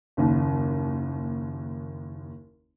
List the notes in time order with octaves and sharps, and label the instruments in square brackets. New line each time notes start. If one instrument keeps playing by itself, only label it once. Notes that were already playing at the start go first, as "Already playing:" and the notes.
[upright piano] F#1 D#2